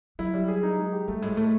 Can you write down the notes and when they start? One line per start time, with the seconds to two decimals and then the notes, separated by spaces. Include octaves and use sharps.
0.19 F#3 E4
0.34 G3
0.48 G#4
0.63 D#4
0.78 G#3
0.92 G4
1.08 G3 A3
1.22 A2 G#3
1.37 A2 A3